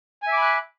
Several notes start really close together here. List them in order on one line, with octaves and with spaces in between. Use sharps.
G#5 E5 D6 B5 F#6